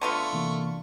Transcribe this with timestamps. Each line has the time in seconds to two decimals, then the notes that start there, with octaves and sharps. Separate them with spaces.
0.01 D3 A3 B3 F4 C#6
0.33 C3 E3 A#3